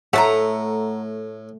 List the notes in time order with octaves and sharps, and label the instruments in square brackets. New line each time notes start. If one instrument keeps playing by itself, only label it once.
[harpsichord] A2 [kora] A3 [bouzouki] F#5 A5 A#5